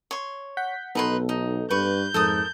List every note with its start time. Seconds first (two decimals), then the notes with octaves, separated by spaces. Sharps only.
0.11 C#5 C6
0.57 F#5 G6 B6
0.95 B1 B3 D#4 A4 B4 C6
1.29 D#4
1.70 G2 B4 C#6 G6
2.14 F2 G#2 A4 A#4 D#6